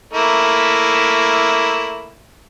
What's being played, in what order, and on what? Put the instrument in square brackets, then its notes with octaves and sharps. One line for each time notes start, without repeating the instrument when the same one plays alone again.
[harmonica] A3 A#3 E4